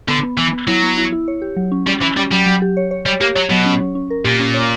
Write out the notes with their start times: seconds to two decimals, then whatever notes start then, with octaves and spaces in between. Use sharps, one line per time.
0.08 D3 B3
0.23 B3
0.37 E3 B3
0.53 B3
0.67 F#3 E4
0.83 B3
0.97 E4
1.12 E4
1.28 C#5
1.42 G4
1.56 F#3
1.72 C#4
1.86 G3 C#4
2.02 E3 C#4
2.17 G3 C#4
2.31 F#3 G3
2.46 F#3
2.62 G4
2.77 C#5
2.91 C#5
3.06 G3 C#5
3.21 A#3 G4
3.35 F#3 C#5
3.50 B2 F#3
3.66 C#4
3.80 C#4
3.95 C#4
4.10 A#4
4.24 A#2 G4
4.40 C#4
4.54 C#5